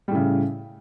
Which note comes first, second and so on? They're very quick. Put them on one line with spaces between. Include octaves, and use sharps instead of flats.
G3 A2 C#3